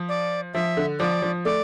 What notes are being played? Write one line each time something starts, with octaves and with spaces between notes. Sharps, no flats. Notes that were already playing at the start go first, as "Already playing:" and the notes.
Already playing: F3
D5
F3 E5
D3
F3 D5
F3
A3 D5